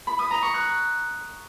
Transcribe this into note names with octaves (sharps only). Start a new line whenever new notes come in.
B5
D#6
A#5
C#6
F#6